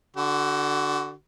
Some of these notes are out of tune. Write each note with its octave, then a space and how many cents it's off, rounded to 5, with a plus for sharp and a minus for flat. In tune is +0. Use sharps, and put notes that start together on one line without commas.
D3 +0 F#4 +25